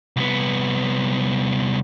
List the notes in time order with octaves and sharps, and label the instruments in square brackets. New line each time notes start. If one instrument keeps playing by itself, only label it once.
[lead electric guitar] C2 B3